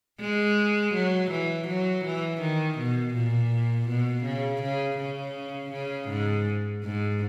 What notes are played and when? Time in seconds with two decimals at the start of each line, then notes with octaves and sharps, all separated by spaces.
0.21 G#3
0.94 F#3
1.31 E3
1.68 F#3
2.05 E3
2.41 D#3
2.78 B2
3.15 A#2
3.89 B2
4.25 C#3
4.63 C#3
4.99 C#3
5.72 C#3
6.09 G#2
6.83 G#2